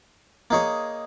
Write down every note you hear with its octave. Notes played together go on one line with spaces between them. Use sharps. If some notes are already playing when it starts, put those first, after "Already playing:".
A#3 D#4 G#4 C#5